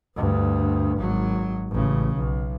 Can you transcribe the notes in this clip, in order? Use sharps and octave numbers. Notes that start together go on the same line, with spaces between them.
D2 G2
G#1 F#3
A1 C#3
B1